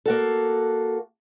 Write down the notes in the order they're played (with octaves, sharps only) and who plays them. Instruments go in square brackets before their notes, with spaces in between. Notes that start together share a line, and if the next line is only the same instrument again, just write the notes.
[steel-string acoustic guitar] A#3 F#4 A4